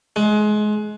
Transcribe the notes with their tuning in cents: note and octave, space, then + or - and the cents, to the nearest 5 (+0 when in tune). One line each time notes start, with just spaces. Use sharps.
G#3 +25